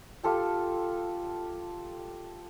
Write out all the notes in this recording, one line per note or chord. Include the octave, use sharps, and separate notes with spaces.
F4 G4 A4 G5